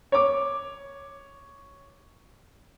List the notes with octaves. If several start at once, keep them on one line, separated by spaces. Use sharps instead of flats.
C#5 D6